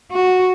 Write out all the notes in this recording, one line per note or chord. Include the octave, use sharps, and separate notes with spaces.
F#4